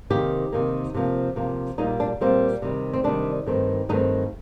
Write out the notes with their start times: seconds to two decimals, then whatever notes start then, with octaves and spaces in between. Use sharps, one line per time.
0.10 C3 D#3 A#3 G4
0.52 C3 D#3 A#3
0.94 C3 F3 A#3
1.36 C3 F3 A#3
1.78 A#2 G3 A#3 D#4
2.00 D4
2.21 A#2 G3 A#3 C4
2.62 C3 D#3 G3
2.93 C4
3.04 C3 D#3 G3 D4
3.46 G2 D#3 A3 C4
3.89 G2 D#3 A3 C4 D#4